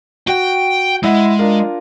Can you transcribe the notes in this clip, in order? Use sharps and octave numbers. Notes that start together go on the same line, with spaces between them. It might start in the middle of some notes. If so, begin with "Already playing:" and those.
F#4 G5
G#3 E4 F#5
D4 F4 A#4